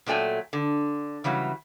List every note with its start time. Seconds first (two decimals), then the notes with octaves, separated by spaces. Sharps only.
0.06 A#2 F#3 A3 G5 G#5
0.53 D3
1.24 C#3 E3 F#3 G3